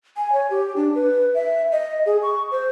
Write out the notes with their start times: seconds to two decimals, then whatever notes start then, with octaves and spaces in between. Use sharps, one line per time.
0.17 G#5
0.33 C#5
0.51 G4
0.76 D4
0.95 B4
1.35 E5
1.72 D#5
2.06 G#4
2.23 C#6
2.51 C5